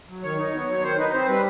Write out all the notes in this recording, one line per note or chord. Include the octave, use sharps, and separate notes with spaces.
F#3
D#3 C#5
D#4
B3
F#3 C#5
D#3 C5
D#4 B4
C4 C5
G3 B4